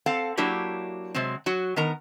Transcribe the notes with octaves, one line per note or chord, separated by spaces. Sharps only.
C4 A4 F5 F#5
F#3 A#3 D4 E4 F#4 G4
C3 F#3 G#3 C4
F#3 F#4
D#3 B3 A#4 A#5